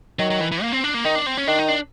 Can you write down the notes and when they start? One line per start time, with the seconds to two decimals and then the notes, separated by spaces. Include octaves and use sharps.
0.19 D#3 F#3
0.30 F#3
0.41 E3
0.52 E3
0.62 A#3
0.72 C4
0.84 D4
0.94 A#3
1.04 D#3 D#4
1.15 D4
1.27 C4
1.37 C#4
1.47 D#3 D4
1.59 D#4
1.68 D4